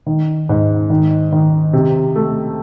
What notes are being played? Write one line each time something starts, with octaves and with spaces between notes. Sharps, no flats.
D#3
G#2
D#3
D#3
C3
A3